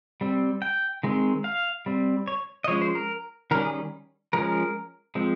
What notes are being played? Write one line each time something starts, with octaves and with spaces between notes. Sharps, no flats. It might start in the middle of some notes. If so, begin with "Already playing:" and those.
G3 C4
G5
D#3 G#3 C4
F5
G3 C4
C#5
D#5
F3 G#3 C#4 C#5
C5
A#4
D#3 G3 C#4 A#4
G#4
F3 G#3 C#4 A#4
F3 G#3 C4